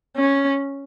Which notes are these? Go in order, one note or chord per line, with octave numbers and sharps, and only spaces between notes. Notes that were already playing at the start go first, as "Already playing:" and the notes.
C#4